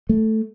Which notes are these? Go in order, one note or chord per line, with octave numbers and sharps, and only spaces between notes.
A3